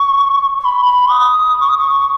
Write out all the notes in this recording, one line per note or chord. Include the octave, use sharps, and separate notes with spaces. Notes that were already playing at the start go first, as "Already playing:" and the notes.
Already playing: C#6
C#6
B5
B5
D#6
C#6
D#6
C#6